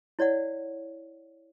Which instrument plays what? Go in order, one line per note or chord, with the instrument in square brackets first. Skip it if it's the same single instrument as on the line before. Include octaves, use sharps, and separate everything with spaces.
[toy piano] E4 C#5 D5 F#5